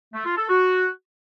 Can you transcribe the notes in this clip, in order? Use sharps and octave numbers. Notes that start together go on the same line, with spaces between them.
A3
F4
A4
F#4